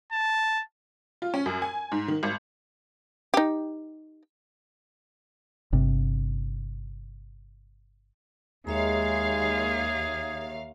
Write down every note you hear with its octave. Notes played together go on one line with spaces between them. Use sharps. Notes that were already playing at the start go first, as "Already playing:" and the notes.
A5
F4
C#4
F#2
G#5
G#2
D#3
G#1
D#4 G4
G1 C3
D#2 G#3 G#4 C#5 E5 F5 A#5